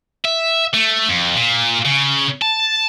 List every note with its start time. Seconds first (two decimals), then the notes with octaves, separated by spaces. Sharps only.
0.25 E5
0.74 A3
1.09 F2
1.36 A#2
1.85 C#3
2.42 A5